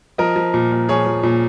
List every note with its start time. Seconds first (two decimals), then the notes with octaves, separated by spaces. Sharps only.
0.18 F3 A#4 D#5
0.36 F3
0.54 A#2
0.72 A#2
0.89 F3 G#4 C#5
1.06 F3
1.23 A#2